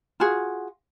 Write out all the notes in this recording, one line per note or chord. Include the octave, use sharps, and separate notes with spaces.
F4 F#4 G#4